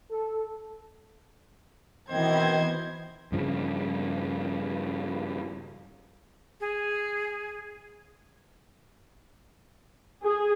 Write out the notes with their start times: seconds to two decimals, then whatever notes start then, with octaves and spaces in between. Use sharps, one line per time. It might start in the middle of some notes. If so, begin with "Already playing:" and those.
0.10 A4
2.10 B2 D#3 E3 B3 C4 C5 D#5 G#6
3.32 G2 C#3 F3
6.60 G#4
10.23 G#4